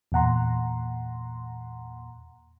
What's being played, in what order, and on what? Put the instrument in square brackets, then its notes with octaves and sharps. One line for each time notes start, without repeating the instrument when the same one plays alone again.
[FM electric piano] E2 A#2 F#5 A#5 C6